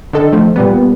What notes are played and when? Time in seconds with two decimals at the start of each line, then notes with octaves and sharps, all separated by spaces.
0.13 D3 D#3 A4
0.32 D#3 F3 A3
0.56 A#2 G3 B3